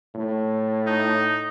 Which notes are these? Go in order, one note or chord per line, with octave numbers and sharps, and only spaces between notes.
A2
D#4